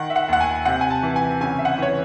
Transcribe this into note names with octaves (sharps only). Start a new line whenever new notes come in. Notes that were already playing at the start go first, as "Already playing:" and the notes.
Already playing: D#3 F#5
E5
F#5
D#2 F#5
G#5
C3 F#5
G#5
A5
E3
G#5
C#3 G#5
E5
F#5
E3 C#5